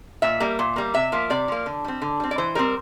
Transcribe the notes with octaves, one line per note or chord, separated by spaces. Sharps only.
A#2 E5
G3 A#3
A#2
G3 A#3
C3 E5
F3 A#3
C3 D5
F3 A#3
D3
G3 C4
D3
G3 C4
D5
E3 C5
G3 C4 A#4